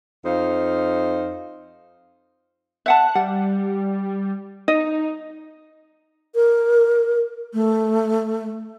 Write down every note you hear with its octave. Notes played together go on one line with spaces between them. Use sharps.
F2 D#4 C5 F5
E5 F#5 A5 F#6
G3 F#5
D#4 D#5
A#4
A3